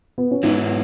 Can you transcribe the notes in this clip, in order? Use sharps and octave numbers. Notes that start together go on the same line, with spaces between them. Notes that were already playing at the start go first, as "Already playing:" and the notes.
B3
C#4
G#2 F#3 B3 D#4 E4